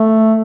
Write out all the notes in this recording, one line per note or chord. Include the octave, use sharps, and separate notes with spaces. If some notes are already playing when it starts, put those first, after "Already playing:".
Already playing: A3